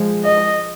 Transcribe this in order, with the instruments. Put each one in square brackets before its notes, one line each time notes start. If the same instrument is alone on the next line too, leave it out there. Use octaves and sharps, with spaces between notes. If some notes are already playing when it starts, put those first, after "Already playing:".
Already playing: [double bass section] F3 G#3
[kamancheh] D#5